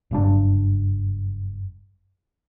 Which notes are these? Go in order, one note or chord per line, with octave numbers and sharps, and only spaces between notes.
F#1 G2 D4